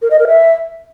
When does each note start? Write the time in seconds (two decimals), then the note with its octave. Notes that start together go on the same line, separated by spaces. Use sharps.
0.02 A#4
0.11 D#5
0.19 A#4
0.28 E5